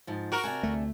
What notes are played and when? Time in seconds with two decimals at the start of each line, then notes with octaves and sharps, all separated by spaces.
0.07 G#2 F3
0.32 F#4 A#4
0.44 C3 D4 G#5
0.63 D2 A3